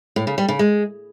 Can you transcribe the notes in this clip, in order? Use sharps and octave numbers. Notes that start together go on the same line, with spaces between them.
A2
C#3
G3
C#3
G#3